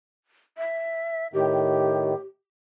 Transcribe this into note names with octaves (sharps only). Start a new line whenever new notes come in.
E5
A2 D#3 G4